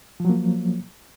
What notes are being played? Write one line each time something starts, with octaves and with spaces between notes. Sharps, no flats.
F3 F#3 A#3